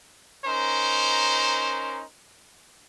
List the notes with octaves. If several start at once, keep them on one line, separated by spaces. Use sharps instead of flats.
C#4 D#4 A#4 C5